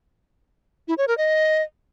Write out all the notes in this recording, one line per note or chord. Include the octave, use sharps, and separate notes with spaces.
E4
C#5
A#4
D#5